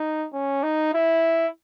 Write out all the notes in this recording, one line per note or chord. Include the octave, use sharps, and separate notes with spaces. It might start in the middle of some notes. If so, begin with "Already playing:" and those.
Already playing: D#4
C#4
D#4
E4